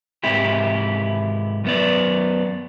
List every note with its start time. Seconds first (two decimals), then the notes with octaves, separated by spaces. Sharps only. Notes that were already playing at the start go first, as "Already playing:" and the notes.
0.23 G#2 C3 E4 G4
1.64 F#2 B3 D5